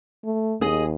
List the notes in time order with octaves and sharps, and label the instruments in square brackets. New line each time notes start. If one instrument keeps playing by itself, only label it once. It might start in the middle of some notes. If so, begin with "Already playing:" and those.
[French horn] A3
[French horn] D#2 [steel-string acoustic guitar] G#4 D#5